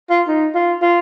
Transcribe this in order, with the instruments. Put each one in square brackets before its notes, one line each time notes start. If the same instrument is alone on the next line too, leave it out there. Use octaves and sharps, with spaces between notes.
[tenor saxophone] F4
D#4
F4
F4